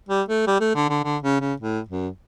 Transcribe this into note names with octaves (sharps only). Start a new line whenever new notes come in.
G3
A3
G3
A3
D3
D3
D3
C#3
C#3
A2
F#2